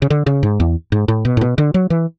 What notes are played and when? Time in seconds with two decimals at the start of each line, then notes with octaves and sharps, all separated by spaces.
0.02 C#3
0.10 D3
0.26 C#3
0.43 G#2
0.60 E2
0.92 G#2
1.08 A2
1.25 B2
1.37 A2
1.41 B2
1.58 D3
1.74 F#3
1.90 E3